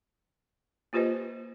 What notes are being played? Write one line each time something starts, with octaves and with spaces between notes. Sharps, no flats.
A#3 F4 G4 B4 C5 D#5